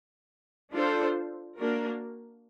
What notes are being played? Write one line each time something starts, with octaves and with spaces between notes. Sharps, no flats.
D4 F4 A4 C5
A#3 D4 F#4 A#4